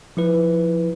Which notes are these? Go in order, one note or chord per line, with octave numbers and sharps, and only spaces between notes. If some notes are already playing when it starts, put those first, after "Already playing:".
F3 E4 B4